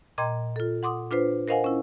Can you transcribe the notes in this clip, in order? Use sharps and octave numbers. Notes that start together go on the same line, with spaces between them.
A#2 D#5 G5 A#5 C6 G#6
F4 A4
F#5 C6 D6 D#6
D4 F4 B4 C5
A#4 C5 D#5 F5 F#5 G#5
C#4 E4